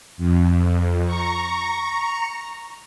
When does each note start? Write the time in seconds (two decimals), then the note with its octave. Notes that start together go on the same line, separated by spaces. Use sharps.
0.17 F2
1.05 A#5 C#6